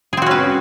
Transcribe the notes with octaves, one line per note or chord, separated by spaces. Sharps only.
C4 C#4 F#4 G#4 B4